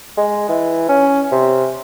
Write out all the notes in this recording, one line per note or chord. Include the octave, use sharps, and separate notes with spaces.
G#3
E3
C#4
C3